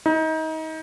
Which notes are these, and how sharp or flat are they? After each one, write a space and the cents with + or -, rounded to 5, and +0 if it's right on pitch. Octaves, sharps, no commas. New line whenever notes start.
D#4 +30